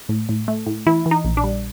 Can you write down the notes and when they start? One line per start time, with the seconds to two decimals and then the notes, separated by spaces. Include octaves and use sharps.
0.09 A2
0.29 A2
0.48 A3
0.66 A2
0.86 E3 E4
1.06 E3
1.11 D#4
1.24 A#1
1.37 D4
1.44 G3